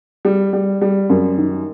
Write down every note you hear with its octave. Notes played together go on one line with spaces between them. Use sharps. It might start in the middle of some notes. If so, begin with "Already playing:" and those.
G3
G3
G3
F#2
D#3